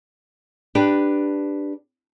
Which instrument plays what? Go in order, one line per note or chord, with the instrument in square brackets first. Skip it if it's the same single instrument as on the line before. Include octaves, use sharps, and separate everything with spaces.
[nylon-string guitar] D4 G4 B4